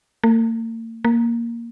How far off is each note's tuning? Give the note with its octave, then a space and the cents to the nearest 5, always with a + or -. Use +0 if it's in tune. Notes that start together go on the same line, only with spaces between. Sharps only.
A#3 -45
A#3 +0